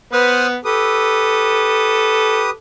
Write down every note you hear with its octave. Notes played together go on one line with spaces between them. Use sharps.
B3 B4 C5 D#6 F6
G4 A4 B4 D#6